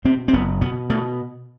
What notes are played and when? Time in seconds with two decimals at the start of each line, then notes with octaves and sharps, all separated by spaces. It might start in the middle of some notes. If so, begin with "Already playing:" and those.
0.05 B2 C4
0.28 C4
0.33 F#1 B3
0.61 B2 B3
0.90 B2 A3